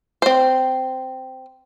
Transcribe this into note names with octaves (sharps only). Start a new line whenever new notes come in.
C4 C5